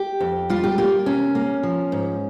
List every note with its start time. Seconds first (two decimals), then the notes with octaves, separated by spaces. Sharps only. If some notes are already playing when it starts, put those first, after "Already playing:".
Already playing: G4
0.20 F2
0.50 G3 F4
0.64 G4
0.78 A#3 F4
1.06 C3 C#4
1.35 A#3
1.63 F3
1.92 G#2